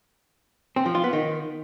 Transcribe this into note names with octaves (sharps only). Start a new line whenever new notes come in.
C4
F3
F4
B3
D#3